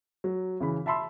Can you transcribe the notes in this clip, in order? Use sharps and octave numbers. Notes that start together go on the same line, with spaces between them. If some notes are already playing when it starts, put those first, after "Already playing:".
F#3
C#3 E3 B5
E5 A5 B5 C6 E6